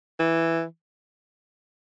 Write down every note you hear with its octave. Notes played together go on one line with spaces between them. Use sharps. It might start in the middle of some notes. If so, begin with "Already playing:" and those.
E3